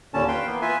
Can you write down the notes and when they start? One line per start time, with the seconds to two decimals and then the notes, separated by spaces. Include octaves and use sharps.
0.14 D#2 A#2 D3 C#4 A5
0.28 B4 F5 G5 C6
0.47 E3 A#3 B3
0.62 F4 B4 E5 G#5